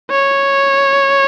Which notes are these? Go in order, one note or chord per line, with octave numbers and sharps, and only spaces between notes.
C#5